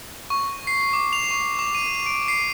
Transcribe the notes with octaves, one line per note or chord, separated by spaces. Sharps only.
C#6
C7
D6
F7
C#6
D6
D#7
D7
C7